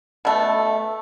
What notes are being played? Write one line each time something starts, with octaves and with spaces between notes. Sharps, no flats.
B2 A3